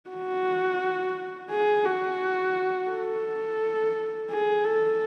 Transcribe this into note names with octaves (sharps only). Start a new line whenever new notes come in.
F#4
G#4
F#4
A4
G#4
A4